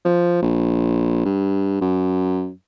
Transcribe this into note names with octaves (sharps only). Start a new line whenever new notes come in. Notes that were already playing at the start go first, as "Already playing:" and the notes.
F3
A#1
G2
F#2